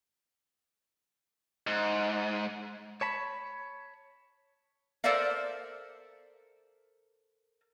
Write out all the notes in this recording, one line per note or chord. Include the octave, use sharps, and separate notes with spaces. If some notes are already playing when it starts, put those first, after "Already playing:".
G#2
C#5 A5 B5
A4 A#4 C5 D5 E5 F5